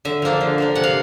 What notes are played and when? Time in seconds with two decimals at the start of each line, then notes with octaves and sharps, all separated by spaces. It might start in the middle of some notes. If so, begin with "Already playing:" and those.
0.05 D3 E5
0.22 F3 A#3 D4
0.41 D3
0.58 F3 A#3 D4
0.75 C3 F#5
0.84 F5